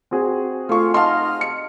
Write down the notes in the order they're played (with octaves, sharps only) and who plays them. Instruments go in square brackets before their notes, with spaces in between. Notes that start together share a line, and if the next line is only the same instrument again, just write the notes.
[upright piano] C4 F#4 G#4
[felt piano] A3 C#6 [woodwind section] F4 F5
[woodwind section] D#4 D#5 F6 [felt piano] F5 A5 C6
[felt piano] C#7